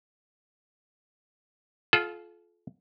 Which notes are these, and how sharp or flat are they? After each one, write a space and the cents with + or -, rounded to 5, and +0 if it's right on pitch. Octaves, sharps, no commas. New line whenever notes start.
F4 +0 A4 -40 F#5 +0